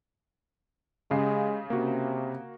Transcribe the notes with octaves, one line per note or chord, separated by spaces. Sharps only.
C#3 G#3 G4 C7
C3 A#3 F#4